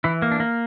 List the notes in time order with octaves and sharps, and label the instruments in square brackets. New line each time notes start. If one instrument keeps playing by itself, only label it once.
[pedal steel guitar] E3 E4
A#3
D4
A#3